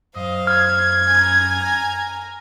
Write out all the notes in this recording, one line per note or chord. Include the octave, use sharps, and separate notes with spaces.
F#2 C5 D#5 F5
F6 G#6
G#5 A#5